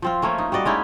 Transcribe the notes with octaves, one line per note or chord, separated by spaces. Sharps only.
F3 C4 F4
F3 A3 A#3 C#4
D#4
G3 F#4 D5 D#5
G#3 C#4 D#4 E4